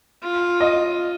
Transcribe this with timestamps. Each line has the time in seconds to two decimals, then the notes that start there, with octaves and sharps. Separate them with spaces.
0.22 F4
0.60 D#5